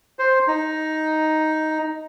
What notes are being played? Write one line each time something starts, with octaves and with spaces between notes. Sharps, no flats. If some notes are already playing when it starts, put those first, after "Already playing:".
C5
D#4